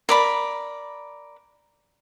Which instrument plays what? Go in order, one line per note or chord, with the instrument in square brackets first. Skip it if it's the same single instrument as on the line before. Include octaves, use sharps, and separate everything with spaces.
[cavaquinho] A#4 D5 B5